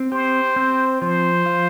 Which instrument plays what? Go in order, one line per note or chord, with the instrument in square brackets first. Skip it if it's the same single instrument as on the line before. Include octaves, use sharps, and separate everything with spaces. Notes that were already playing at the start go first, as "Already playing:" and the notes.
Already playing: [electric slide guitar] C4
[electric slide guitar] G4 [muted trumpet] C5
[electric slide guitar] C4
[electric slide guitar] F3 [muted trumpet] C5
[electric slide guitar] F4